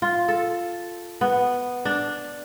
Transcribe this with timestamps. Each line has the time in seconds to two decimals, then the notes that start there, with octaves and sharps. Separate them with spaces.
0.02 F4
0.28 A4
1.21 B3
1.85 D4